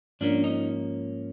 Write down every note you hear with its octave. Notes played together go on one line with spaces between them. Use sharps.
G#2 F3 A#3 C#4 D4
D#4